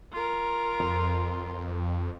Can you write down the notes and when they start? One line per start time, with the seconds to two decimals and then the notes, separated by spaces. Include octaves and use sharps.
0.13 F4 A#4
0.80 F2